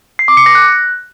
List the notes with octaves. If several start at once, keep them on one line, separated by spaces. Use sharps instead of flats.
C7
D6
C#7
A#6
F#6